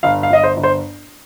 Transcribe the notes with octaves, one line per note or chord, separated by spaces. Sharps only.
G1 F5
F5
G1 D#5
C5
G1
C5